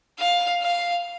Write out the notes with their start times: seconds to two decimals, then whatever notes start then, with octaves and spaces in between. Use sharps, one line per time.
0.19 F5
0.62 F5